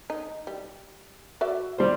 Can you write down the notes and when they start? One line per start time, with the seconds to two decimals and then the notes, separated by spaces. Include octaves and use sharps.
0.10 D#4
0.47 G3
1.41 F#4 D5 E5
1.78 G3 C5